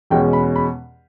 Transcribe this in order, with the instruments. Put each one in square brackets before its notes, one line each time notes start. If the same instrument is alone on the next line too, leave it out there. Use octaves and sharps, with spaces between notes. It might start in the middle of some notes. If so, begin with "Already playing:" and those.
[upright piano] E2 B2 G#3 C#4 G5
B5
B5